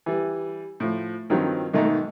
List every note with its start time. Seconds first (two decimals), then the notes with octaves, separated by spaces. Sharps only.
0.06 E3 G3
0.80 A2 F3
1.30 G2 D#3 F3 F#3 C4
1.74 B1 G#2 D#3 A3 D#4